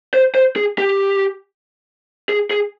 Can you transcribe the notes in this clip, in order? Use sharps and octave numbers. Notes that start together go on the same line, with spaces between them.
C5
C5
G#4
G4
G#4
G#4